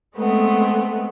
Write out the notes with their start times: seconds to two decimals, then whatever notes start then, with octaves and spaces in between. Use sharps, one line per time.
0.15 G#3 A3 B3 C4